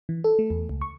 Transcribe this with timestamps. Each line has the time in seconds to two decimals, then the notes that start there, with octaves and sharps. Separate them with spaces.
0.09 E3
0.24 A4
0.39 A3
0.50 E2
0.69 C#2
0.82 C#6